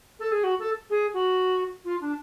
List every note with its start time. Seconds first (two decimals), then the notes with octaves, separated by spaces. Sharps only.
0.20 A4
0.32 G#4
0.44 F#4
0.59 A4
0.90 G#4
1.14 F#4
1.85 F4
2.01 D4